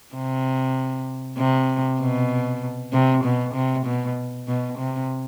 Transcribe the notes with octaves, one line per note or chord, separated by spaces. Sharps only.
C3
C3
B2
C3
B2
C3
B2
B2
C3